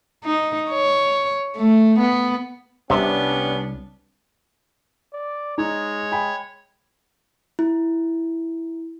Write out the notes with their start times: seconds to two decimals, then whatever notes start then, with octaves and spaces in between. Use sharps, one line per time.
0.24 D#4
0.70 C#5
1.57 A3
2.00 B3
2.90 C2 C3 G3 B3 C#4 D4
5.13 D5
5.58 G#3 D#4 C#5
6.12 G5 G#5 B5
7.59 E4